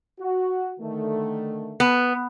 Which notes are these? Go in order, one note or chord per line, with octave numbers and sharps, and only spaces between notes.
F#4
D3 D#3 A3
B3